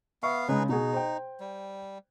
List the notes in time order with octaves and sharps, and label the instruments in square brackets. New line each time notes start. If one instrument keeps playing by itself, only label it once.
[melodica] B3 F5 [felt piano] E5 C#6
[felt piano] C#3 G#3 [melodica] D#4 G#4 B4
[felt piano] B2 F#4 G#4 [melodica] D#4
[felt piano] C5 G5
[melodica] G3